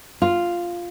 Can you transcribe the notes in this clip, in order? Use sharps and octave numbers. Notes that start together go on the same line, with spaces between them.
F4